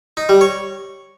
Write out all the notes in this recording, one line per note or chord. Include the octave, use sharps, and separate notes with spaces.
D#4
G3
C#5